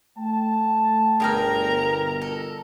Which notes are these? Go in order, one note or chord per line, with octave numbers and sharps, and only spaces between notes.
A3 G5 A5
G1 B2 G#4 A#4 G5 A#5 F6
A4